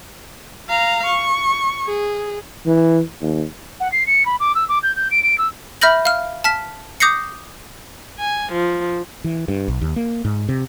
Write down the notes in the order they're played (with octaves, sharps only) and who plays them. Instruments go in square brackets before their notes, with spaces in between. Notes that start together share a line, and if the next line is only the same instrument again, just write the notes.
[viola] F5 A#5
C#6
G#4
[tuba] E3
D#2
[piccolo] F#5
C7
C#7
B5
D6
E6
D6
G6
G6
D7
D7
E6
[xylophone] E5 B5 F6 G6 A#6 F#7
F5 F6
A5 F6 B6
D6 D#6 G6 A#6 C7 C#7
[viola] G#5
F3
[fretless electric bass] E3
G2
B1
D#2
A#3
G#2
C3